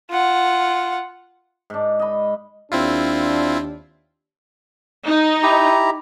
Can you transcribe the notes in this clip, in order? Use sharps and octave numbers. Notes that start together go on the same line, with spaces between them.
F4 F#5
G#2 D4
D#5 B5
D#2 C4 D4 E4 F4
D#4
E4 G4 A#5